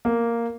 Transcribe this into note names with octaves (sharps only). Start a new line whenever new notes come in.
A#3